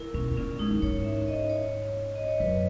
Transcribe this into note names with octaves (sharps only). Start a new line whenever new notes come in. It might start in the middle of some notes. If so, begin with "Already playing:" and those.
Already playing: E4 A#4
B2 C#4
B2
A#2 C#4
G#2 D#4
F#2
G#2 C#5
E5
E5
D#5
C#5
D#5
C#5
F#2 B4